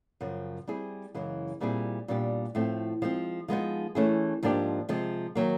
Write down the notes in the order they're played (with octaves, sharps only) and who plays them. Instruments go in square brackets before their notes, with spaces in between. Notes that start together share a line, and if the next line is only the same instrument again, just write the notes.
[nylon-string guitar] F#2 C#3 F3
G3 C4 E4 G#4
F#2 C#3 E3 G#3
A#2 G3 C4 E4 G#4
A#2 G3 B3 D4 G4
A2 F3 A3 C4
F3 G#3 C4
F3 G#3 B3 D#4
E3 A3 C#4 E4 G#4
G#2 F3 A#3 D4 G4
C3 F3 G#3
D#3 F#3 A#3